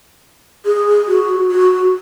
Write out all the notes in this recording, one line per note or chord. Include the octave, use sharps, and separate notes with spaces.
G#4
F#4
F#4